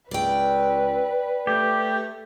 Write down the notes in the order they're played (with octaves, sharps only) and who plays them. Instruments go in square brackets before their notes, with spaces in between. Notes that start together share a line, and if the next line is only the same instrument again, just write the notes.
[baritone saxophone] C#2 [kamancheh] B4 [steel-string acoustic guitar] D5 G5
[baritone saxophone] A3 [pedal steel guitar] G4